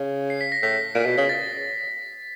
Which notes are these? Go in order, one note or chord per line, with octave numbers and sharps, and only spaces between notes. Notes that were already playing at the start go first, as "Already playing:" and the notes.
Already playing: C#3
C7
B6
A#6
A2 B6
A#2
B2
C#3
A6